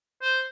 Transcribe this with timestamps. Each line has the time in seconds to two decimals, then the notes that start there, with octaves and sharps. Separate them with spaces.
0.22 C5